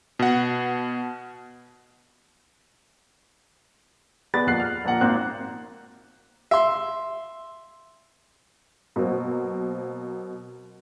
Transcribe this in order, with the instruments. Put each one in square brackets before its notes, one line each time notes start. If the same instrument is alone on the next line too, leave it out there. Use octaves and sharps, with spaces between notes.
[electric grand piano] B2 F#5
[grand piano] B3 G#4 D5 B5 A6
F2 A#3 F#5 F#6 C7
F6
A#1 A#3 F#5 A#5
G#1 A#3 C4 F#6
[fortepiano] E5 C6
[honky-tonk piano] B2 F#3 A#3 C4